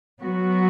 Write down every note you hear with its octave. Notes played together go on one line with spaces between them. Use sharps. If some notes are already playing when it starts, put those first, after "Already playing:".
F#3 B3 F#4